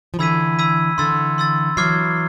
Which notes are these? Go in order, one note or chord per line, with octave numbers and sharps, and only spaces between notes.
F3
D3 E3 B5 E6 G#6 B6 D#7
B5 E6 G#6 B6 D#7
D3 E3 C6 E6 A6
C6 E6 A6
E3 F#3 D6 F6 G#6 C7